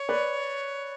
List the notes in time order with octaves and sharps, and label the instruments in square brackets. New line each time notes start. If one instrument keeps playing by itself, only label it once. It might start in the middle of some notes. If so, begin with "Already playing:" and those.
Already playing: [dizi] C#5
[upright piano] B4 D5